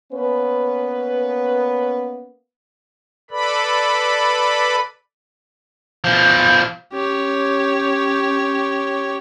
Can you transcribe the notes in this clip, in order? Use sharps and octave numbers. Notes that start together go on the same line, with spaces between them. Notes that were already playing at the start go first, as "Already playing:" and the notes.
A#3 B3 C#4 B4
A4 B4 D5 B5
B2 F3
C#4 G4 C#5